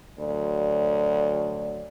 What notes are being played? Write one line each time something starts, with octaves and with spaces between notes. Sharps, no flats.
D2 F#3 D5